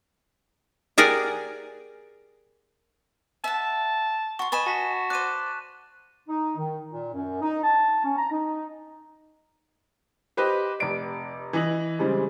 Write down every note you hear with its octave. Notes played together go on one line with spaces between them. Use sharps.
G4 G#4 A#4 D5 F#5 G#5
E5 F#5 A5
F#4 C6 C#6
B4 D#5 G#5 A6 E7
F#4 A5 B6
C5 D5 F#6 D#7
D#4
D#3
A#2
F#2
D#4
A5
C#4
A#5
D#4
G4 B4 C5 D#5
F1 D5 D7
E3 D#5 F#7
C#3 E3 G3 G#3 C4